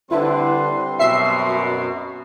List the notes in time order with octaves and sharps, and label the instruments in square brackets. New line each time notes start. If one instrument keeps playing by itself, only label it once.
[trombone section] D3 D4 [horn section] G3 C4 C6 [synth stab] E4 [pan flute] B4
[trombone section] F#2 B2 [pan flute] F#4 [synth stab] E5 C7